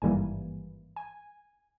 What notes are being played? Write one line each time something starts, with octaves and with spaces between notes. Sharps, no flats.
G#1 G2 E3 G3 A#3 G#5
G#5